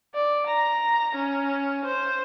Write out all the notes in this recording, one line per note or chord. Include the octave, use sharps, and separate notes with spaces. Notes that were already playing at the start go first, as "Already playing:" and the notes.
D5
A#5
C#4
C5